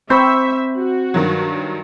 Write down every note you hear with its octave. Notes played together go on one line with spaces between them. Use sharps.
C4 C5 E5 B5 C#6 G6
F#4
G2 D#3 F#3